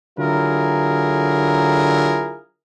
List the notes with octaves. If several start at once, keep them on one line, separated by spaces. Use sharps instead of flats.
D3 F#3 E4 F4 G#4 A#4